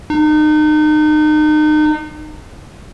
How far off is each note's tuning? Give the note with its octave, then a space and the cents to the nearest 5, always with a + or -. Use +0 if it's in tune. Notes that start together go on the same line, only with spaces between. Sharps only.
D#4 -35